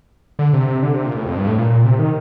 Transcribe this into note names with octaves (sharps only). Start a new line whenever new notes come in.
D3
C3
C3
D3
C3
A#2
A2
F2
G2
A2
A#2
A#2
C3
D#3